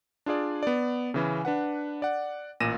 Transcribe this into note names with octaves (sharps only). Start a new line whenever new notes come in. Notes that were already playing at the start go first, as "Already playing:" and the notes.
D4 F4 G#4 D5
B3 D5
C#3 E3 C#4
D4 B4 F#5
D5 F#5
A1 A#2 A#6 D#7 E7